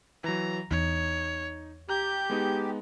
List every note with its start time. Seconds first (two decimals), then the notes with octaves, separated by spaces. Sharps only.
0.24 E3 F#3 A#5
0.71 E2 D#4 C#5
1.89 G4 A#5 G6
2.30 G#3 B3 D#4